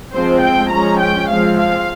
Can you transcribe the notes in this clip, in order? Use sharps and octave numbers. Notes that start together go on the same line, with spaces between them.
F3 G#3 C4 C5
G5
F3 G#3 C#4 A#5
G5
F3 G#3 C4 F5
F5